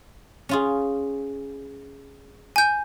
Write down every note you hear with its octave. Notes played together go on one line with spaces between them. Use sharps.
C#4 F4 G#4
G#5 G6